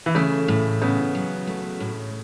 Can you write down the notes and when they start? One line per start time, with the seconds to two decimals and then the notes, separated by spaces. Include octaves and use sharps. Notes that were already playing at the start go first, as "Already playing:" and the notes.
0.06 E3
0.15 C#3 A3
0.48 A2
0.82 C#3 B3
1.15 F#3
1.47 A3
1.80 A2